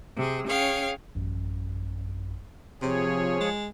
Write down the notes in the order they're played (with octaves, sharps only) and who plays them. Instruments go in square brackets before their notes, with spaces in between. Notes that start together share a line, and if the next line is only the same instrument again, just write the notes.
[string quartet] C3 G#4
C#4 G#4 C#5 F5 G5
[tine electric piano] A1 F#2
[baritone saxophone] C3 [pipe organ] F3 G#4 C#5
[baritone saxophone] G#3